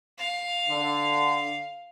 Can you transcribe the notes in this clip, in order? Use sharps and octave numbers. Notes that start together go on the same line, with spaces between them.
F5
D3